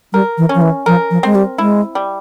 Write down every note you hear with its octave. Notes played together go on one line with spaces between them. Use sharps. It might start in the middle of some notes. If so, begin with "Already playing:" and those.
G3 A#4
E3
C#4
F3
E3
F3 A#4
F3
G#3 C4
G3
G#3 E4
G3